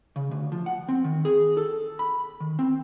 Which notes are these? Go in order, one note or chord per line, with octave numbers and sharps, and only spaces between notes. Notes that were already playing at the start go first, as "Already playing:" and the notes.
C#3
D2
F3
F#5
C4
D#3
G#4
A4
B5
D#3
C4